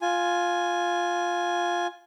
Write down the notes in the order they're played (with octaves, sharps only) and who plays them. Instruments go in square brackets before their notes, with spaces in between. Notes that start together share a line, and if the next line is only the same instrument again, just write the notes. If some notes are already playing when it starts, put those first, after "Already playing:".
[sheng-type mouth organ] F4 G#5